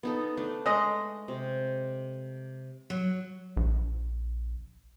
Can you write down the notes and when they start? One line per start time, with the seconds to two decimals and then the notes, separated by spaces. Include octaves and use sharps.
0.03 B3 D#4 A4
0.37 A3 D4
0.66 G#3 A3 D#5 F#5 A#5
1.28 C3
2.90 F#3
3.57 A#1